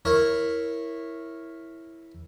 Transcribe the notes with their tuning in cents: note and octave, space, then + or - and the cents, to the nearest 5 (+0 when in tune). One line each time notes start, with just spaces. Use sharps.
E4 +0 A#4 +0 C#5 -15